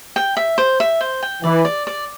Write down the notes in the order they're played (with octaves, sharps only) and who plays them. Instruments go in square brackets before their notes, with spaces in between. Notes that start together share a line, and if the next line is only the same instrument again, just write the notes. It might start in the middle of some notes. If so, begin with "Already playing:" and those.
[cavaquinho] G5
E5
C5
E5
C5
G5
[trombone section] E3 [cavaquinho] D5
[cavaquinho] D5
D5